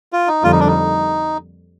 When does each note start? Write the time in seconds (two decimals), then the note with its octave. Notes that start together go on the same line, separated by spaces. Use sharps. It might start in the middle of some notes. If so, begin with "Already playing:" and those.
0.13 F4
0.28 D#4
0.43 F2 D3 G3 A#3 F4
0.52 D#4
0.60 D4
0.67 D#4